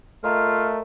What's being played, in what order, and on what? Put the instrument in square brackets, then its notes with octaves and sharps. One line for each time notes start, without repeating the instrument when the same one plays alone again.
[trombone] A3 [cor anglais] F4 [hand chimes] A#4 D#5 A#5 [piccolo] F6